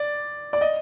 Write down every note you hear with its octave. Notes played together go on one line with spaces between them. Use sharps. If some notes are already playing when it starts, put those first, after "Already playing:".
Already playing: D5
D5
D#5